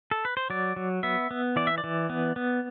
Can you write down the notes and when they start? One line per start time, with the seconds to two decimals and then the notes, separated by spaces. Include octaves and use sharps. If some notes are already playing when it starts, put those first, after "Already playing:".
0.11 A4
0.25 B4
0.37 C5
0.50 F#3 D5
0.76 F#3
1.03 B3 E5
1.31 B3
1.56 E3 D5
1.67 E5
1.78 D5
1.84 E3
2.10 B3
2.36 B3